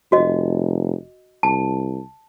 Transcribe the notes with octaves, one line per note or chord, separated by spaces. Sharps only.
F1 F#4 D#5
C2 A5